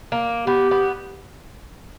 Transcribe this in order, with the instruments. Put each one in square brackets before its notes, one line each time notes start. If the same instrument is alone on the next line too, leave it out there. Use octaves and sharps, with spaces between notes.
[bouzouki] A#3
[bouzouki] B3 [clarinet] G4
[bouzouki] B3